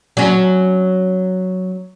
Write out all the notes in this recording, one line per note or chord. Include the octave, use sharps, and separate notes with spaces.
F#3 C#4